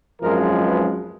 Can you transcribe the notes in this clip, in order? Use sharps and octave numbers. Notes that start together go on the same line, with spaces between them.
G#1 F#2 F3 G#3 A#4
B4